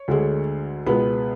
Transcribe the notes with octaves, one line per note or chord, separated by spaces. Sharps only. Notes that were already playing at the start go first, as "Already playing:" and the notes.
Already playing: C#5
D2 D3 G#3
C#2 B2 G#3 B3 B4